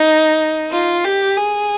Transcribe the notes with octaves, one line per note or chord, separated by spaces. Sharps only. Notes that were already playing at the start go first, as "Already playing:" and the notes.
Already playing: D#4
F4
G4
G#4